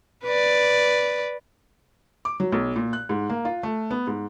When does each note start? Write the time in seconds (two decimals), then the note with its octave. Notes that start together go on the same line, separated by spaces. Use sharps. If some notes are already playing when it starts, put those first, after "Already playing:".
0.24 B4 D5
2.25 D6
2.40 F#3
2.52 B1
2.76 A#2
2.93 F#6
3.09 G#2
3.30 A#3
3.45 F4
3.63 A3
3.91 B3
4.07 G#2